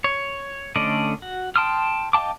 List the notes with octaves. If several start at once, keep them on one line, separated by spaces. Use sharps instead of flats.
C#5
D3 A3 C#4 D5 D#5
F#4
G5 A5 C6 D#6 F6
D#5 F5 G5 A5 D6